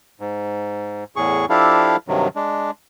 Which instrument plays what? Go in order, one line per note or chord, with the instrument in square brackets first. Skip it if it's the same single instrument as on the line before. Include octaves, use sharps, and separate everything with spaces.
[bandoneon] G#2
E2 A2 G#4 C#6
F3 D4 E4 G4 A4 F5
G2 C3 D#3 F#3
G#3 D4